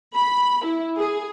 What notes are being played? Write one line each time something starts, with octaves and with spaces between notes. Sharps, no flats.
B5
E4
G#4